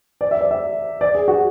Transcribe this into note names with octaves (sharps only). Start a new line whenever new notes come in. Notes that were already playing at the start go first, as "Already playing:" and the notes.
D5
E5
D5
E5
D5
G#4
F#4